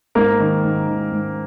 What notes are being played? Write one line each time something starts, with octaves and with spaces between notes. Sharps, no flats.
G#2 A#3 A#4
D#3
G#2
D#3
G#2